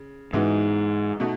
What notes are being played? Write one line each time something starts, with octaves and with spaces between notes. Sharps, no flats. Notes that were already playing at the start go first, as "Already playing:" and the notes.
Already playing: C#3
G#2 E3 G#3 B3 D#4 F#4
B2 A3 D#4 F#4